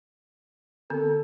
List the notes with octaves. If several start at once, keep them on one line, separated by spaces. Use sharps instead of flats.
D3 B3 C4 A4